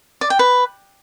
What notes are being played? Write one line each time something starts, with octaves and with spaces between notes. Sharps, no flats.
D5
G5
B4